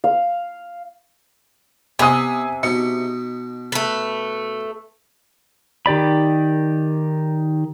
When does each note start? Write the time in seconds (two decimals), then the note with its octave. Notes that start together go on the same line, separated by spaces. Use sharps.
0.04 F5
1.99 C3 B3 D#5 G#5 D#6
2.63 B2 D#4 C#7
3.72 A3 B4
5.86 D#3 G4 D5 B5